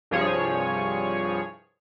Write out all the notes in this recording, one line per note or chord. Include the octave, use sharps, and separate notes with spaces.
C2 G2 F3 G#4 C#5